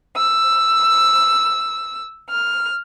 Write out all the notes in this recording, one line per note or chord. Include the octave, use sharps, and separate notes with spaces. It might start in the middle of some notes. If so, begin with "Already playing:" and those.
E6
F6